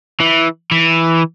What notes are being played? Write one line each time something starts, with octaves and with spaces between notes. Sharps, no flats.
E3
E3